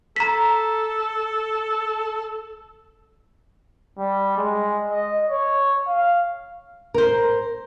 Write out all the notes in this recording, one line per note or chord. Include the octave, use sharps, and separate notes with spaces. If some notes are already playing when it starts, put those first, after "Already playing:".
A4 A#5 B6
G3
G#3
D#5
C#5
F5
A#4 C5